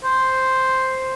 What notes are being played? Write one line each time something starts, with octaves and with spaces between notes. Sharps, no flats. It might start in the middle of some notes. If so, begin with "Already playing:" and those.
C5